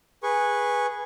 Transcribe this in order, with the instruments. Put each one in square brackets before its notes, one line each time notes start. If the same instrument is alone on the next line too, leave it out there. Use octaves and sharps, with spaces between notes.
[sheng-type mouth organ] G#4 B4 C#6